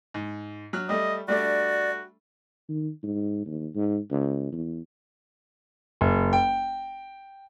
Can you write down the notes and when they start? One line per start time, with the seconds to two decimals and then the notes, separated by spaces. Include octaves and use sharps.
0.14 G#2
0.73 F#3 F6 F#6
0.89 G3 A3 D#5
1.28 G3 A3 D4 F#4 D5
2.69 D#3
3.03 G#2
3.46 D#2
3.75 G#2
4.11 C#2
4.52 E2
6.01 F#1
6.33 G5